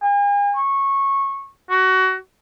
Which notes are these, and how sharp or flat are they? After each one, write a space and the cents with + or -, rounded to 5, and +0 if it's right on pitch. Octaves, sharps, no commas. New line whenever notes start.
G#5 -40
C#6 -15
F#4 +20